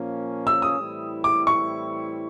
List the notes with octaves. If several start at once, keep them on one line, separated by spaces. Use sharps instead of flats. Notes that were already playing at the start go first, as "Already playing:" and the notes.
Already playing: A#2 F3 A#3 C#4
E6
D#6
A2 E3 G3 C4 E4
D6
C#6